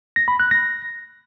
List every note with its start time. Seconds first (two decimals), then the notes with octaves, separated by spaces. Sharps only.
0.16 A#6
0.28 B5
0.40 F#6
0.51 A#6